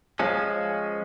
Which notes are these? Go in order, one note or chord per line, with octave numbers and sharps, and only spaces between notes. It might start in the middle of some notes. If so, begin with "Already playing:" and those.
F3 G#3 C#4